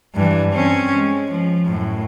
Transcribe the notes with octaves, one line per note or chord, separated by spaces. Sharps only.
G2 E3
C4 C#4
G#3
F3
F#2 A2